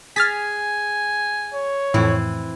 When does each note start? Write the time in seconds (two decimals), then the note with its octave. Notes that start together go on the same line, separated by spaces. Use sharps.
0.16 G#4 G#5 F6 A6 B6
1.54 C#5
1.94 F2 A2 E3 C4 E4